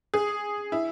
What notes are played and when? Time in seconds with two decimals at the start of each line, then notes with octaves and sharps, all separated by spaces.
0.14 G#4
0.72 E4